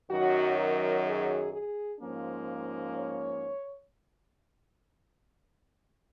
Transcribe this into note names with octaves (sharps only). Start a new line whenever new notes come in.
F#2 D#3 F#3 F#4
A#4
G#4
G#4
G#2 F3 A#3 C#4
C#5